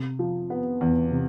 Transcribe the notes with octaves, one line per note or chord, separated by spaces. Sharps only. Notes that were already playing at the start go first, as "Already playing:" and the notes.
Already playing: C3
F3
B3
E2
C3